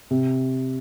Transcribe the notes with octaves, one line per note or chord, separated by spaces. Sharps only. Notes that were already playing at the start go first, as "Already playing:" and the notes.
C3